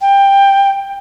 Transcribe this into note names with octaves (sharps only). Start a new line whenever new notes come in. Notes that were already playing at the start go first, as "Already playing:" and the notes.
G5